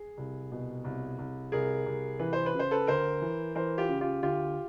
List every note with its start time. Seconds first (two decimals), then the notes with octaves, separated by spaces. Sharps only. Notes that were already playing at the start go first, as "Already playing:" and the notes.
Already playing: G#4
0.17 C2
0.52 B2
0.84 C2
1.18 C2
1.52 C2 G#4 A#4
1.86 C2
2.19 E3 B4
2.33 C5
2.46 B4
2.54 C#3 C5
2.71 A4 B4
2.87 D2 A#4 C5
3.22 E3
3.55 E3 A#4 C5
3.78 F4 G4
3.89 C#3
4.01 F4 G4
4.22 D2 F4 G4